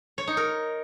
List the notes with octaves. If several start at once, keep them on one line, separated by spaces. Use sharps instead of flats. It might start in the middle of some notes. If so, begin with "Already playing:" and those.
C#5
D#4
A#4